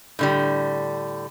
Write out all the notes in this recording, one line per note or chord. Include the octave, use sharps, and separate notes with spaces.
A2 D3 G3